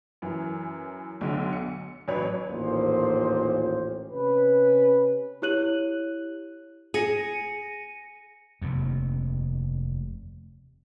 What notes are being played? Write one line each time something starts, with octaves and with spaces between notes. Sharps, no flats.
F#2 E3
B1 D3
C#7
A1 F#3 B4 C#5
A1 D#2 A#2 F3 C5
C3 C#4 B4
E4 G4 C#5 F#6 D#7 F#7
G#4 A#6 C#7 D#7
F1 D#2